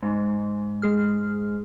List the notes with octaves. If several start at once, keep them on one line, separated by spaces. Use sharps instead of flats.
G#2
G#3 G#4 F6